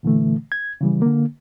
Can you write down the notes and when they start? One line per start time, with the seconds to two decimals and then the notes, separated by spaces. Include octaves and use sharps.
0.03 A#2 D3 E3 A3
0.52 G#6
0.81 C#3 E3 G3
1.02 D3 A#3